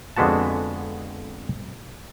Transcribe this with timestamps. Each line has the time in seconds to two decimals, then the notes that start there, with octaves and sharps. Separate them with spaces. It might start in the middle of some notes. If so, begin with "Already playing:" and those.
0.16 F2 D3 G#3 B3 F#4 A5